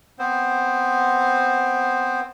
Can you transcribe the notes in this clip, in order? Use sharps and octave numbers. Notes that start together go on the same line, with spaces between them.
B3 C4 C5